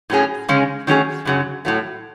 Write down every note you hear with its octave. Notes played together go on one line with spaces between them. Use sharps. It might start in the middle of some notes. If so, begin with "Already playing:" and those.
A2 F#3 C#4 G#4
C#3 G#3 C#4 G#4
D#3 F#3 A3 C#4 G#4
F#2 C#3 F#3
A2 F#3 A3